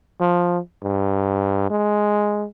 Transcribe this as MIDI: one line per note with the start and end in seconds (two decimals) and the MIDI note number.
0.21 0.59 53
0.83 1.66 43
1.71 2.46 56